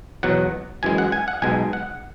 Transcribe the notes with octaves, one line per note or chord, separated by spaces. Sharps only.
E2 B2 F#3 F#5
F#2 E3 G#3 G#5
F#5
G#5
F#5
B1 B2 G#3 G#5
F#5